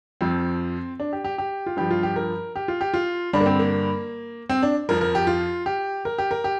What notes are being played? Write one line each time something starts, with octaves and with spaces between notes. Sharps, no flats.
F2 F3 C4
D4
G4
G4
G4
F4
G2 F3 G4
F4
G4
A#4
G4
F4
G4
F4
G2 D3 G3 D4
A#3
C4
A#3
C4
D4
F2 F3 A#4
A#4
G4
F4
G4
A#4
G4
A#4
G4